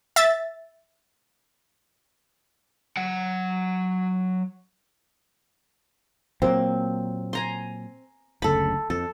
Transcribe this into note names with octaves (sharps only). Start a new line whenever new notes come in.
E5 A6
F#3 F#5
A#2 F#3 A#3 C4
G#5 A#5 C6
F#1 D2 C#3 A4 B5
F2 A4